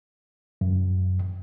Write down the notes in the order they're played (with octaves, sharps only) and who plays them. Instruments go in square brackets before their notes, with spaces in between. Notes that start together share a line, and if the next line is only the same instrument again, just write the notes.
[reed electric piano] F#2